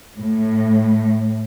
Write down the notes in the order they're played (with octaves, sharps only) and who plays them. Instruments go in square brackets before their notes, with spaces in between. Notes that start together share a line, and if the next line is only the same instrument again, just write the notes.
[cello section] A2